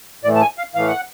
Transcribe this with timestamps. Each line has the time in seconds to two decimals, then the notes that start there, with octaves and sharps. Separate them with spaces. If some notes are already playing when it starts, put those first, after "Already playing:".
0.24 A2 E3 A3 D5
0.35 A5
0.41 G#5
0.58 F5
0.75 A2 E3 A3 F5
0.88 F#5